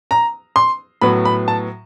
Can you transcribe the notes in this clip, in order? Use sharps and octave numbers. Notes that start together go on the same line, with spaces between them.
A#5
C6
A2 F#3 B3 B5
B5
A5